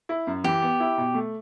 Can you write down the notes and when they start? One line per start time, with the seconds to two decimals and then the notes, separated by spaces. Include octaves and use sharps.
0.09 E4
0.27 F#2
0.44 E3 G4
0.62 B3
0.80 E4
0.98 B2
1.14 A3